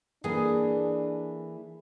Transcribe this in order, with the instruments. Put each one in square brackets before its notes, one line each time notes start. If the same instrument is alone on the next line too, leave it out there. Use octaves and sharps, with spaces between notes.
[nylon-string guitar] E3 A#3 A4 [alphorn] D4 [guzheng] G#4